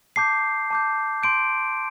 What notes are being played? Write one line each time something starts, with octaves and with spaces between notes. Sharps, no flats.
A5 D6 G6 C7
A5 D6 G6
C6 G6 D7